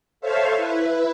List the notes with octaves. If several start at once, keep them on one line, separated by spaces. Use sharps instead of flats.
A4 C5 C#5 E5 F5
E4 B4